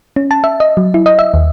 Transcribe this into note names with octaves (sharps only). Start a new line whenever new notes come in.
C#4
A5
E5
D#5
F#3
E4
D#5
E5
D#2